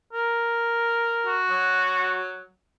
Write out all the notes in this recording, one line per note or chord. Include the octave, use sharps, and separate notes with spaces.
A#4
F#4
F#3